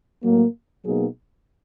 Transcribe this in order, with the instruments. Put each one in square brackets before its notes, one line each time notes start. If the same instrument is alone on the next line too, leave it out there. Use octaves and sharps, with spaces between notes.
[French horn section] A2 F#3 A#3
B2 F#3 A#3 D#4 G#4